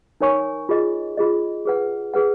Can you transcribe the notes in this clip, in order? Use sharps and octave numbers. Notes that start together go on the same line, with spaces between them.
D#4 A#4 C#5 G#5 C#6
F4 G#4 D#5
F4 G#4 D#5
G#4 B4 F#5
G#4 B4 F#5